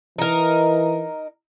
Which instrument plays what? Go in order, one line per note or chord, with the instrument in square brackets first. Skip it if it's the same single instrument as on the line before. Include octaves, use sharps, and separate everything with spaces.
[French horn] E3 [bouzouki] D#4 A#4